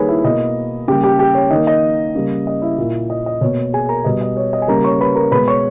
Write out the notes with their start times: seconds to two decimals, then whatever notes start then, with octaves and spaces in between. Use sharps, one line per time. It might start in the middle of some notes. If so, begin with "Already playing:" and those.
Already playing: D#3 G3 A#3 G#4 B4 C#5 G#5 B5
0.09 E4 E5
0.24 B2 A#3 D#5
0.88 C#3 G3 A#3 G4 G5
1.03 G4 G5
1.19 G4 G5
1.35 C#5
1.51 D#3 A#3 D#5
1.67 D#5
2.15 C#3 G3 A#3
2.47 D#5
2.62 E4 E5
2.78 A#2 A#3
3.10 D#5
3.26 D#5
3.41 B2 A#3 C#5
3.73 G#4 G#5
3.89 A#4 A#5
4.04 B2 G3 B3 D#5
4.21 D#5
4.37 C#5
4.53 D#5
4.62 G#5
4.68 C#3 G3 A#3 A#4 A#5
4.84 C#5 C#6
5.00 B4 B5
5.15 A#4 A#5
5.31 B2 G#3 B3 B4 B5
5.48 C#5 C#6